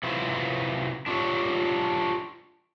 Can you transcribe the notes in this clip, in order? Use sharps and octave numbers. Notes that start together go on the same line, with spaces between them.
C3 F#3 E4 F4 B4 C5
D4 F4 G4 A4 C#5